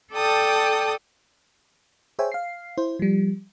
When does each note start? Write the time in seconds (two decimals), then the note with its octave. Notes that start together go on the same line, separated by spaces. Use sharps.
0.13 A4 D5 G5 A5 D#6
2.19 G#4 C5 C#5 E5 G5 G#5
2.32 F5 C7
2.78 E4 C5
2.99 F3 G3